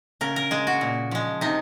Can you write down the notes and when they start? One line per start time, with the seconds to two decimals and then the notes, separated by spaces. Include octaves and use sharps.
0.21 C#3 A#4
0.36 A#4
0.51 G#3 G#4
0.67 F#4
0.81 A#2
1.11 F3 G#3
1.41 C3 D#4